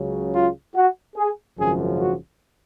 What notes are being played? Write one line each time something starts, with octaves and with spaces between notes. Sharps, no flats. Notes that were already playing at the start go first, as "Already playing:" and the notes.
Already playing: C#2 C#3 F#3
F4
F#4
G#4
G#1 F#2 C#3 F3 G#4
F#4